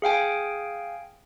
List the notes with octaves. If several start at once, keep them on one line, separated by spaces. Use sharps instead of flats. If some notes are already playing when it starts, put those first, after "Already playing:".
G#4 F5 G5 G#5